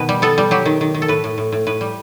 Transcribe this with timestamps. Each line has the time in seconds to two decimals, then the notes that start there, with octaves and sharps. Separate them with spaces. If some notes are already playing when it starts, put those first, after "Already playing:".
Already playing: B2 D#3 B4
0.09 G3
0.22 B3 A4
0.38 G3
0.51 F#3 G4
0.66 D#3
0.81 D#3
0.94 D#3
1.02 A4
1.08 A2 B4
1.24 A2
1.38 A2
1.52 A2
1.67 A2 B4
1.81 G3